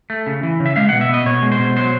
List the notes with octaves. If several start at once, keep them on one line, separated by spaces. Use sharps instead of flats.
A3
C#3
E3
C#3
E5
G#3 F5
B2 F#5
E5
B3 D#5
B2 C#5
G#3
C5
B2
F#3 C5